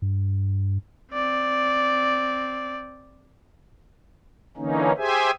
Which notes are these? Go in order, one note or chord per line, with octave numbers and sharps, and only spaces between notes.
G2
C4 D5
D3 E3 A#3 C#4 D#4
G4 G#4 C5 E5 G#5